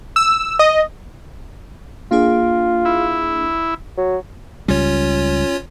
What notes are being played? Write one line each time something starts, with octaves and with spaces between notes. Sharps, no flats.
E6
D#5
A#3 D4 F4 G#4
E4
F#3
C#2 G3 C#4 F4 C#5